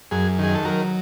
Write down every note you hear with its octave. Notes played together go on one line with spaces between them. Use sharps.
F#2 G#4
D#3 G#4
A4
F#3 A#4